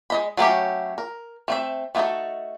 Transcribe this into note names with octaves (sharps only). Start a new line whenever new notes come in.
G#3 D#5 B5
F#3 A3 C#4 G4
A#4
A3 C4 E5
A3 B3 D#4 F#4 A4